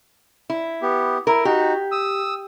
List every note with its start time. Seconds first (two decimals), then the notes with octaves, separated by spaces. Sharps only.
0.50 E4
0.82 B3 G4
1.27 E4 A#4
1.45 D#4 F#4 G4
1.92 D#6 E6